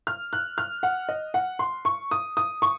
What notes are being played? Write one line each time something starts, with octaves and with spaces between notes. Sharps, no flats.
F6
F#6
F6
F#5
D#5
F#5
C6
C#6
D#6
D#6
C#6